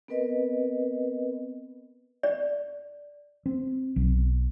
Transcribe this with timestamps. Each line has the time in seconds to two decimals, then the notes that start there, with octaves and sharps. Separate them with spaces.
0.08 B3 C4 A#4 B4 D#5
2.23 D5
3.46 C4
3.96 B1